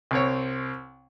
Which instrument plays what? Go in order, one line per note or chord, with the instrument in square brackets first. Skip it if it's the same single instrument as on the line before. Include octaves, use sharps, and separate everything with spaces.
[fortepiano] C2 C4 C#5